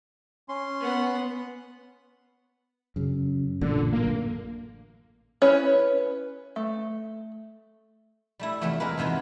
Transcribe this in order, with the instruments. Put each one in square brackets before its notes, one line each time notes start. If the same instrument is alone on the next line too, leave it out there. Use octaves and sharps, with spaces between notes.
[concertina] C#4 C6
[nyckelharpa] B3 F#5
[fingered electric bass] F#2 C#3
[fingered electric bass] A1 F#2 A#2 [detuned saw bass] D3
[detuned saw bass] A#3
[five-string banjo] C#4 E4 B4 C#5
A3
[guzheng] G3 A3 E4
E2 C3 E3 F3 A3
G#3 A#3 A#4 B4
E2 C3 D#3 E3 F#3